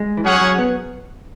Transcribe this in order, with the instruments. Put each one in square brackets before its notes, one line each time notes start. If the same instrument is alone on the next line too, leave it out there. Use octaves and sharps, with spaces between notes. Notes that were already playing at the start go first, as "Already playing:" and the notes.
Already playing: [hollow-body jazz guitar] G#3
E3
[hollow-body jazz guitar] F#3 [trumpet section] C#4 G#4 C#5 F#5
[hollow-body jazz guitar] F#3
B3